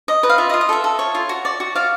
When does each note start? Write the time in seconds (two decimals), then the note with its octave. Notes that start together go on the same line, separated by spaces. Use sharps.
0.08 D#5
0.23 B4
0.29 F5
0.38 F4 E5
0.49 D#5
0.54 F4
0.61 D#5
0.69 A4 E5
0.84 A4
0.99 C#5
1.15 F4
1.29 F#4
1.45 D5
1.60 F#4
1.75 D5 F5